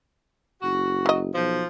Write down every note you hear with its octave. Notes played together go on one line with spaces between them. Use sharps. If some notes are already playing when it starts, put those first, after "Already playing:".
F#1 F#4
F#3 D#5
B1 F3